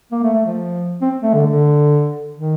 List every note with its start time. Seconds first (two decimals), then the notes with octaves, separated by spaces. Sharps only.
0.12 A#3
0.23 A3
0.33 A3
0.46 F3
1.01 C4
1.23 A3
1.34 D3
1.46 D3
2.35 D#3